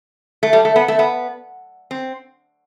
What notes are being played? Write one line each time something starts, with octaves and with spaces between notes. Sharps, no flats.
A3
G3
A3
B3
A3
B3
C4